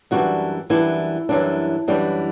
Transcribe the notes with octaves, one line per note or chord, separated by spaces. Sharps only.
F#2 E3 G3 D4 F#4
F#2 E3 G3 D4 E4
F#2 E3 G3 D4
F#2 E3 G3 D4